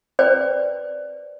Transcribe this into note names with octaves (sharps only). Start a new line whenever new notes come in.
B4 C5 D5 G5